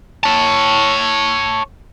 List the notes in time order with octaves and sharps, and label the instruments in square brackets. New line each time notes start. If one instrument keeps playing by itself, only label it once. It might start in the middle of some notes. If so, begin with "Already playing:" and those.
[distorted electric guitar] C#5 A5